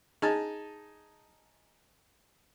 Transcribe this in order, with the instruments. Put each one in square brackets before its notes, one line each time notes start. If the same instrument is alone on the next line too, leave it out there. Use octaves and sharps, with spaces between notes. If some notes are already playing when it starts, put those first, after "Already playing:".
[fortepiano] D#4 G#5 A5 [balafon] G#4